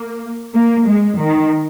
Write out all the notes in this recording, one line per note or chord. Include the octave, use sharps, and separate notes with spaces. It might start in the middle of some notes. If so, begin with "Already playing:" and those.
Already playing: A#3
A#3
G#3
D#3